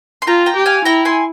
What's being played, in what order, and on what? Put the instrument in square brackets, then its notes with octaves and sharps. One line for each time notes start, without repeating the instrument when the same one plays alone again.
[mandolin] C6
[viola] F4 [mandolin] G5 A#5
[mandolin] G5 A#5
[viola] G4
[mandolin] F5 G#5
[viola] E4 [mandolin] G5 A#5
[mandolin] G#5 C6